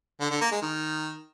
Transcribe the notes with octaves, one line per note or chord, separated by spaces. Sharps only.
D3
D3
A#3
G#3
D#3